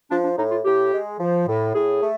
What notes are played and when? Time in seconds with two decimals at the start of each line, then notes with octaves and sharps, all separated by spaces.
0.10 F3 D4
0.24 D4
0.37 A2 D#4
0.51 F4
0.65 A2 G4
0.92 G#3
1.19 F3
1.47 A2
1.74 A2 G#4
2.02 A3